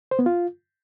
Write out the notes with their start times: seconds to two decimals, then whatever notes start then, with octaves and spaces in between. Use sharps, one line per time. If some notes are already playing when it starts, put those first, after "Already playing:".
0.11 C5
0.19 B3
0.26 F4